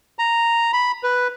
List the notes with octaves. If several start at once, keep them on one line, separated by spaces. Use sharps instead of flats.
A#5
B5
B4